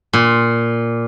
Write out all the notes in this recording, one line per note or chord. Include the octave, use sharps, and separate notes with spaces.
A#2